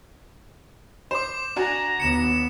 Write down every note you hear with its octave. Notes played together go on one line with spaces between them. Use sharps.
C5 D6 E7
D4 F#4 G#5 A#5
D#2 B3 C#7 E7